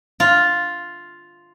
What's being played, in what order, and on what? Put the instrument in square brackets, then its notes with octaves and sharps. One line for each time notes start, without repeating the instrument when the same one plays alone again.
[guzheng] F4